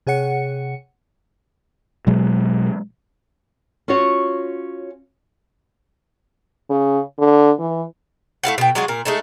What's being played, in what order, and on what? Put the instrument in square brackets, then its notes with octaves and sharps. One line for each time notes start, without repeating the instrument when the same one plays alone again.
[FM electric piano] C3 G#4 C#5 F#5 C#7
[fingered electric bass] B2 F#3 G#3
[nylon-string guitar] C#4 F4 F#4 C#5
[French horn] C#3
D3
E3
[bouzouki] A3 E4 F5 F#5
B2 G5
F#3 G#3 F4 F#4
A#2 A#4
G#3 A3 D#4 A4